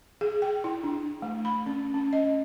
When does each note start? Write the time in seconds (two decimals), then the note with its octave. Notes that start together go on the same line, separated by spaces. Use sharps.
0.21 G#4
0.42 G5
0.64 E4
0.84 D4
1.22 A3
1.45 B5
1.66 C#4
1.94 C#4
2.13 D#5